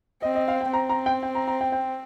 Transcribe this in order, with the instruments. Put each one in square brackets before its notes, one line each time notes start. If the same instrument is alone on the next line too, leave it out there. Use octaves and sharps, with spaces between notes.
[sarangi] C4 [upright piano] D#5
[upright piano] D#5
F5
G5
[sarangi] C4 [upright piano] A#5
[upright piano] A#5
G5
G5
A#5
A#5
G5
G5